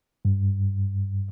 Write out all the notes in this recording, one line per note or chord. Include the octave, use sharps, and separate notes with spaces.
G2